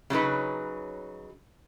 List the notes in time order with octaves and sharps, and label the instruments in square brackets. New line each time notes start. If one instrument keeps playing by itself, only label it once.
[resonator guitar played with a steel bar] C#3 F#3 D#4 B4